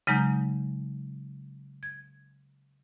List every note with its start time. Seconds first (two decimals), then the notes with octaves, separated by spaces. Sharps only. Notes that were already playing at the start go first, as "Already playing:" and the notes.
0.07 C#3 F#3 G#3 D#4 A#5 G6
1.83 G#6